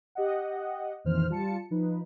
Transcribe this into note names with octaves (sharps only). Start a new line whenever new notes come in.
G4 D#5 F#5
F2 A#2 D#3 E3 C5 F6
G3 F4 A5 C#7
F3 D#4 B4